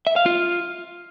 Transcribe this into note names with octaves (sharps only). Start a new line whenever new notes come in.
E5
F5
F4